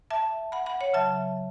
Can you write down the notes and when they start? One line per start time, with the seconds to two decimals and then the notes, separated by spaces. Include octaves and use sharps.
0.11 E5 A5
0.52 F#5 B5
0.66 F#5 B5
0.81 C#5 F#5
0.94 C#3 F#3 E5 A5